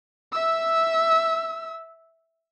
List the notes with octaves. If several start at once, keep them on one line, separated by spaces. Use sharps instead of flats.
E5 E6